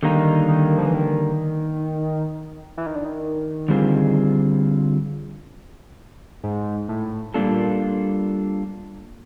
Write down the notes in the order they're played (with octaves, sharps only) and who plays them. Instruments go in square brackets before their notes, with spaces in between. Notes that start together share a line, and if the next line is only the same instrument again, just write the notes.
[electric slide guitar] D3 G3 A#3 D#4 [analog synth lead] D#3
[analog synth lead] D#3
F3
E3
D#3
E3
D#3
D3
D#3
[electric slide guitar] D3 G3 C4 F4 G#4
[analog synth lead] G#2
A2
[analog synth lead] A#2 [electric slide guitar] G3 A#3 D4 F4 A4